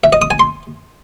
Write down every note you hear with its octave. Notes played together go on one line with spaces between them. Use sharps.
E5
D#5
D#6
G#5
C6